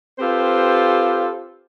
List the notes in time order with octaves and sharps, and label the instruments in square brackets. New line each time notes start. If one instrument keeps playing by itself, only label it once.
[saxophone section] C4 F4 G4 A4 B4 C5